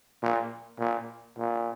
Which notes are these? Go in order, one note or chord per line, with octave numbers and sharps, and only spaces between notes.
A#2
A#2
A#2